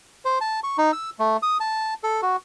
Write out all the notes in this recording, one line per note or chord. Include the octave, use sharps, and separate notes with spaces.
C5
A5
C#6
D#4
E6
A3
D#6
A5
A4
F#4